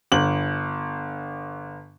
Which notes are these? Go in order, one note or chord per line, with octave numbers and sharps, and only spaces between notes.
G1 F#7